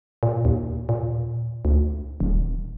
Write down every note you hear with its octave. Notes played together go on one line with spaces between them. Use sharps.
A#2
D#2
A#2
D2
D#1